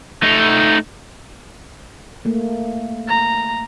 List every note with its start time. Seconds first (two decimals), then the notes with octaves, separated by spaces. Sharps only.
0.23 A3 D#4
2.25 A3 A#3
3.08 A#5